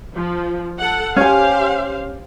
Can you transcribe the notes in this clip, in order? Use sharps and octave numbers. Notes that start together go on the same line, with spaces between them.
F3
A4 F#5
C#4 G4 C5 F5 G#5